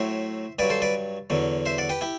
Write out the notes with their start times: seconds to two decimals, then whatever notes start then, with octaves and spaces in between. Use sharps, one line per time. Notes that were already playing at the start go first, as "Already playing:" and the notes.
Already playing: A2 F#3 C5 E5
0.59 G2 F#3 B4 D5
0.70 A4 C5
0.82 B4 D5
1.30 E2 D3 F#3
1.66 C5 E5
1.78 D5 F#5
1.89 G4 B4
2.01 E4 G4